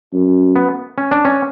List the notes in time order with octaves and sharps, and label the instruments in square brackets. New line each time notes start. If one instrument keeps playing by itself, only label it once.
[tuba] F#2
[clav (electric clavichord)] B3
C#4
D4
C#4